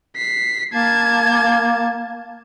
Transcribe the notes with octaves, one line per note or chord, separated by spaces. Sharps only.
B6 C7
A#3 A5 G#6